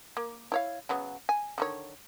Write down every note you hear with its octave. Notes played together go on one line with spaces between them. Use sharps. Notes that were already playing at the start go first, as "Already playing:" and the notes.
A#3
E4 C#5 F5
C#3 F#3 B3
G#5
D3 D#3 C#5